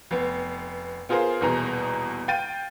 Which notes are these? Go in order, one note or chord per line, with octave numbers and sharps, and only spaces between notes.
F1 B3
B3 F4 G#4 A#4 C5 F5
D#1 E2 B2 G#4 A#5
F5 G5 G6 A6 D#7